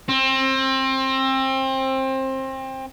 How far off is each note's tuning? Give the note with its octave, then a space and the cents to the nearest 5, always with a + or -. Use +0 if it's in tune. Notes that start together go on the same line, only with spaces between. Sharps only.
C4 +25